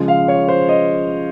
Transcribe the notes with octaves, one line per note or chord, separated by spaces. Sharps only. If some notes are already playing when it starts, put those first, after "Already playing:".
Already playing: C#3 F3 G#3
F5
C#5
C5
D#5